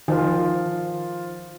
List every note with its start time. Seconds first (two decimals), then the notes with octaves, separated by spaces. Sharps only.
0.08 D#3 F3 F4